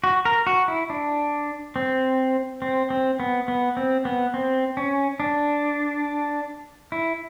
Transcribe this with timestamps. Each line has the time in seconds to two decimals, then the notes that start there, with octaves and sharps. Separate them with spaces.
0.04 F#4
0.25 A#4
0.47 F#4
0.68 E4
0.90 D4
1.76 C4
2.62 C4
2.90 C4
3.20 B3
3.48 B3
3.77 C4
4.05 B3
4.34 C4
4.77 C#4
5.20 D4
6.92 E4